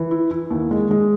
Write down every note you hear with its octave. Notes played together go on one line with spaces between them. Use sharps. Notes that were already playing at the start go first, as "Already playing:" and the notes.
Already playing: E3
E4
E4
D#2
G#3
G#3